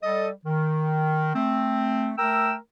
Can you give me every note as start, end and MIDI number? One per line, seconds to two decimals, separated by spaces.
0.03 0.29 55
0.03 0.29 69
0.03 0.29 75
0.46 1.34 51
1.35 2.11 57
1.35 2.11 60
2.18 2.54 57
2.18 2.54 70
2.18 2.54 79
2.18 2.54 88